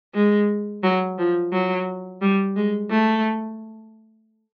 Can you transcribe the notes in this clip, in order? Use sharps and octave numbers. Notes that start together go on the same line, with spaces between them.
G#3
F#3
F3
F#3
G3
G#3
A3